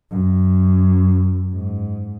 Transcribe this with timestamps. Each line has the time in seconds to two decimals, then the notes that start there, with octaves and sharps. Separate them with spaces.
0.11 F#2
1.52 G#2